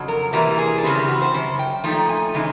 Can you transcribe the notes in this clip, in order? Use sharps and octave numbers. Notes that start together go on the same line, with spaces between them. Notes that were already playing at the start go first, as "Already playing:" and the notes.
Already playing: F2 C#3 F#3
A#4
C3 E3 G3 A#3 A#4
G#4
A4
C#3 E3 G3 C4 G#4
G4
F#4
C5
F#2 C#3
G5
A#2 F3 A3 D#4 G5
G#5
C#3 E3 G#3 C4 D#4 G#5